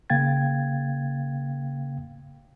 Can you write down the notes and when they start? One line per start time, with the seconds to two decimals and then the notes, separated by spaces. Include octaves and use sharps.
0.10 C#3 A#3 F5 G5 G#6 A6